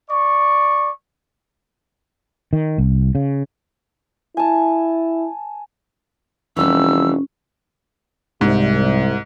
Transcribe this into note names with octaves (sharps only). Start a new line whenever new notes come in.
D5 C#6
D#3
C2
C#3
E4 G#5 A5
F1 E3 G3 C#4 E6
C2 G#2